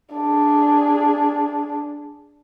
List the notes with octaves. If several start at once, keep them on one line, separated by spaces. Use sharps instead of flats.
D4 G#4